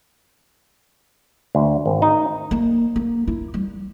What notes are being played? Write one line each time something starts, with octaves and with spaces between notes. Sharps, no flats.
D2
G#1
D#4
A#3
A#3
E4
G3